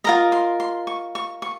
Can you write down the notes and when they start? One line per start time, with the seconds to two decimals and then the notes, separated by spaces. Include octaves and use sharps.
0.04 F4 A#4 D#5 A#5
0.32 C6
0.60 C6
0.87 C#6
1.15 C#6
1.42 C#6